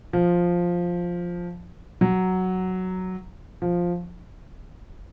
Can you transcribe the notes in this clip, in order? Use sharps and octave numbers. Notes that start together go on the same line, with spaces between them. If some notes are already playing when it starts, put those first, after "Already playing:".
F3
F#3
F3